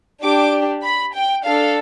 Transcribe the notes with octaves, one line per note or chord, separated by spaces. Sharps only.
D4 G4 D6
B5
G5
D4 A4 F5